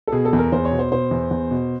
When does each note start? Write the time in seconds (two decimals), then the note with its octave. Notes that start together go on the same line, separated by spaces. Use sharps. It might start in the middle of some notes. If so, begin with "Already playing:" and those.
0.07 A4
0.12 B2 G#4
0.25 A4
0.33 E2
0.39 A#4
0.52 E2 C5
0.65 C#5
0.71 B2
0.79 C5
0.92 B2 C5
1.11 E2
1.31 E2
1.51 B2